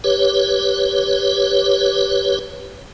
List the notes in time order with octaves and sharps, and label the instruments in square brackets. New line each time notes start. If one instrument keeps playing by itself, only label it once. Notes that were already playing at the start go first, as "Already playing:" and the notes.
[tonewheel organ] G4 B4 C#5